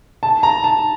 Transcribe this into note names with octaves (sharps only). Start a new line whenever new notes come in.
A5
A#5
A5